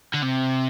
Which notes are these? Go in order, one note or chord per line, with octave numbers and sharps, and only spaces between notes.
D3
C3